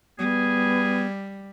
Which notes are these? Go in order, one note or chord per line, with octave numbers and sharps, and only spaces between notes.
G3 B3 G#4